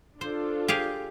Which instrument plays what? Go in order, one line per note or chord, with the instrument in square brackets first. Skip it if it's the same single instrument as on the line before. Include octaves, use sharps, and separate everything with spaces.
[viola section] D4 F4 A4 [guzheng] C5
[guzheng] G4 G#4 F5